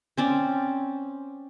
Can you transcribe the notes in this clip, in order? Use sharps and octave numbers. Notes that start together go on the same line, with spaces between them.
C4 C#4 D5